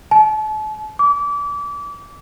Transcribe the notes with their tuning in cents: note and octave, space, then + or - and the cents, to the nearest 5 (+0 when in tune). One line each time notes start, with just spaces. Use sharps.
A5 -40
D6 -30